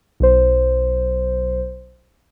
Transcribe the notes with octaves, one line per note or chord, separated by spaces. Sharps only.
B1 C5